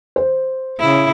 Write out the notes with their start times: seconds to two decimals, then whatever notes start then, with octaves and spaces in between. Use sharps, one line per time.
0.16 C5
0.80 C#3 E4